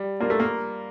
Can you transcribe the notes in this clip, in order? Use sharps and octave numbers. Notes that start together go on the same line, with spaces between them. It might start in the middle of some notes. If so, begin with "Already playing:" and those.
Already playing: G3
A#3 D4 F4 A#4
A3
A#3